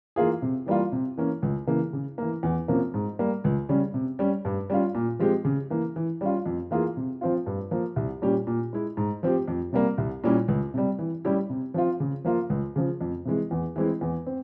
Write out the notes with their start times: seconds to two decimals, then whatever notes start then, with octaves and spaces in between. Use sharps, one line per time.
0.16 E3 A#3 F4 G#4
0.42 C3
0.66 E3 G3 A#3 F4
0.92 C3
1.17 E3 A#3 C#4
1.42 C#2
1.67 C#3 E3 A#3
1.93 C#3
2.18 E3 A#3
2.43 E2
2.68 C3 F3 A#3 C#4
2.94 G#2
3.19 G3 A#3
3.44 C#2
3.69 C#3 G3 C#4
3.94 C3
4.19 G3 C#4
4.45 G2
4.70 G3 C#4 F4
4.95 A#2
5.19 F3 G#3 C4 G4
5.45 C#3
5.70 E3 A#3
5.96 E3
6.21 G3 C#4 F4
6.46 F2
6.71 E3 A#3 F4 G#4
6.97 C3
7.21 F3 C4 F4
7.46 G2
7.71 F3 A#3
7.96 C2
8.22 A#2 G3 C#4 G4
8.47 A#2
8.73 G#3 E4
8.97 G#2
9.23 F3 C4 G4
9.48 F2
9.73 C3 G3 A#3
9.98 C2
10.24 A#2 G3 C#4 E4
10.48 C#2
10.74 C3 G3
10.99 E3
11.25 G3 C#4 E4 G4
11.50 C3
11.74 F3 C4 F4
12.00 C#3
12.24 F3 A#3 F4
12.50 C#2
12.76 C#3 F3
13.01 F2
13.25 C3 E3 G#3
13.51 E2
13.76 E3 G#3 C4 E4
14.01 E2
14.27 C4